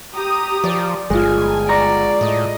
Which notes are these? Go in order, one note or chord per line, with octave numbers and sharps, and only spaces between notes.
G4 A#5 D#6
F3 D5
G1 G#3 F4 G#5
D5 A#5 C#6 A#6
A2 D#5